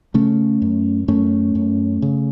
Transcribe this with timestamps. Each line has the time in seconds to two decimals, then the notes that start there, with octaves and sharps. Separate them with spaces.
0.14 C#3 A3 C#4
0.62 F#2
1.08 F#2 A3 C#4
1.55 F#2
2.02 C#3